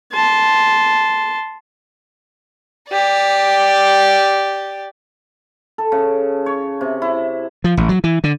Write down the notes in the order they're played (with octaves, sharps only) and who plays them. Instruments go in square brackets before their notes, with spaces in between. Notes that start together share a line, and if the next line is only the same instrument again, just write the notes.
[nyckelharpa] A5 C6
[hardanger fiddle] G4 D5
[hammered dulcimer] A4
C#3
C#5
C3
E4
[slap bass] F3
A1
F#3
E3
D3